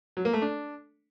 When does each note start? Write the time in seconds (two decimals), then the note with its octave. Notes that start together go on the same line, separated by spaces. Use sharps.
0.17 F#3
0.25 A#3
0.33 A3
0.42 D4